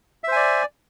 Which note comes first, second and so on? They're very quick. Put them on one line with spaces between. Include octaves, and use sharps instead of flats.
E5 C5 G#5 D5